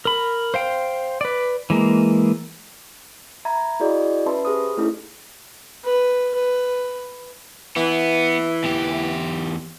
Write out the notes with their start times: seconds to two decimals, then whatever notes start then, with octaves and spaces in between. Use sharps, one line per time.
0.05 A#4 B5
0.54 C5 F5 G5
1.21 B4 D5
1.70 E3 G#3 A#3
3.45 E5 A#5 B5 G#6
3.80 E4 F#4 G#4 D5 D#5
4.26 C#4 B4 E5 A5 B5 C6
4.45 G4 G#4 C5 D#6
4.77 A3 C#4 D#4 E4 A4
5.84 B4
6.35 B4
7.76 E3 B3
8.64 E2 G4